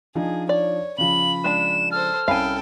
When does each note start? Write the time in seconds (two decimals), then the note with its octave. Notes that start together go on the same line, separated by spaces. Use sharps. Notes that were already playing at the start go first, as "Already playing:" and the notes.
0.15 F3 D4 D#4 G#4
0.49 C#5 D5
0.98 C#3 F3 B5 F#7
1.44 G#3 D4 A5 E7
1.92 A4 C5 F6
2.28 C2 C#4 A4 F5 G5 G#5 B5